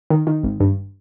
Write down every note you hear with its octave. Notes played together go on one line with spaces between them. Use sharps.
D#3
D#3
G#1
G2